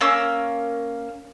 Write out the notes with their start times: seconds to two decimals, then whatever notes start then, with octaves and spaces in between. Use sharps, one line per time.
0.01 A#3 C#4 E6